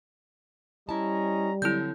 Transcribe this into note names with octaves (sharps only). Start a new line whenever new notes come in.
G3 C#4 E4 D#5 A5 A#5
D3 F#3 C4 E4 G6